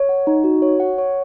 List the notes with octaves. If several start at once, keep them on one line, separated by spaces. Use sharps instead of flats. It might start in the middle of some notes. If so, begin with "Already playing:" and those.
Already playing: C#5
F#5
D#4
F#4
C#5
F#5
C#5